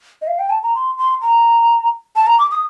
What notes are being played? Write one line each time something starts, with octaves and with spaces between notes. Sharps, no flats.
D#5
F5
G5
A5
A#5
C6
C6
A#5
A5
A#5
D6
D#6